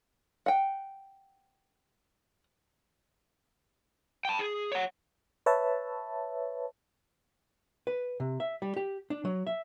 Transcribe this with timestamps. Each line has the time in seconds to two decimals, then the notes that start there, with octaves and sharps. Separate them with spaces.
0.46 F#5 G5
4.25 G5 A5
4.39 G#4
4.72 C#5 F#5
5.46 B4 C#5 E5 A5
7.87 B4
8.20 C3
8.40 E5
8.62 G3
8.76 G4
9.10 D4
9.25 F#3
9.47 E5